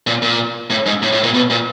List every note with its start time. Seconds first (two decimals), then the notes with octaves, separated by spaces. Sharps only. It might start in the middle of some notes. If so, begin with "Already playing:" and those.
0.07 A#2
0.22 A#2
0.70 A2
0.86 G#2
1.02 A2
1.13 A2
1.24 A#2
1.34 B2
1.50 A#2